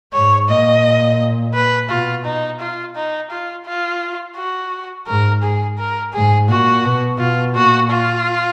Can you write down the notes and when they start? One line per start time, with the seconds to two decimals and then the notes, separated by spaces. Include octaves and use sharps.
0.13 G#2 C#5
0.48 A#2 D#5
1.54 B4
1.89 B2 F4
2.25 D#4
2.60 F4
2.95 D#4
3.31 F4
3.66 F4
4.36 F#4
5.07 G#2 A#4
5.42 G#4
5.78 A#4
6.13 G#2 G#4
6.48 A#2 F#4
6.84 B2
7.19 B2 F4
7.55 A#2 F#4
7.90 F4